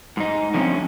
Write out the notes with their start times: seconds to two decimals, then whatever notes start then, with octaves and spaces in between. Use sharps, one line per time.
0.17 G#2 D#4
0.54 D3 F3 A3 A#3 C4 C#4